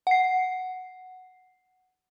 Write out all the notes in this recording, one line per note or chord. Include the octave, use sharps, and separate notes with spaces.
F#5 C7